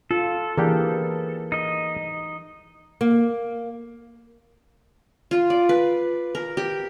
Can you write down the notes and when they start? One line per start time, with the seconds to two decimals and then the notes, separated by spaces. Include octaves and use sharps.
0.11 F4 A4
0.58 E3 A#3 D4 G4 G#4
1.52 D#4 D#5
3.01 A#3
5.31 F4
5.50 D5
5.69 B4
6.35 A#4
6.57 G4